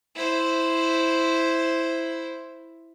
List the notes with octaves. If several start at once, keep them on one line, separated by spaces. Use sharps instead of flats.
E4 C5